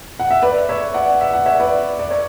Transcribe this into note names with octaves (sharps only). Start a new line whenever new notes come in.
F#5
E5
B4 D5
C#5 E5
D5 F#5
E5
F#5
C#5 E5
B4 D5
D5
C#5